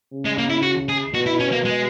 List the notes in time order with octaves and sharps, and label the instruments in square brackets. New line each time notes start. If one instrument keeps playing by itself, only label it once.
[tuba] C#3
[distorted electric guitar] G#3
A#3
E4
F#4
G#4
[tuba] B2 [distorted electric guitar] F#4
[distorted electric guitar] E4
C#4
A#3
G#3